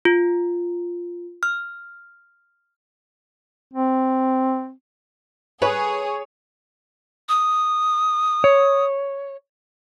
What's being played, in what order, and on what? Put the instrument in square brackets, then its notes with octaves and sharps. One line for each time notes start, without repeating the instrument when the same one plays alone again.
[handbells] F4
F6
[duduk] C4
[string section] G#4 [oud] B4 [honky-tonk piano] C#5
[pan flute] D#6
[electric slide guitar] C#5